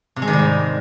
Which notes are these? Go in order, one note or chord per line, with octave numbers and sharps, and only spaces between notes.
C3
G#3
D#3
G3
G#2